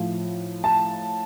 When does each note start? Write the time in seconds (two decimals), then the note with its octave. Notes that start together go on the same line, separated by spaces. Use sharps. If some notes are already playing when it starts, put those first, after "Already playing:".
Already playing: A2 F3
0.64 A5